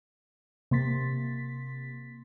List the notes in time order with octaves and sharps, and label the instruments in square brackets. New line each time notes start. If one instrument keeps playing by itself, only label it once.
[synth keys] C3 A#3 C6 A6 B6